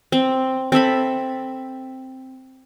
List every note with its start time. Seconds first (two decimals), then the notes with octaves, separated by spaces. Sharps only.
0.12 C4
0.72 C4 A4 E5 B5